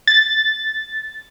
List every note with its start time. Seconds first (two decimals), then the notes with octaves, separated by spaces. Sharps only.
0.07 A6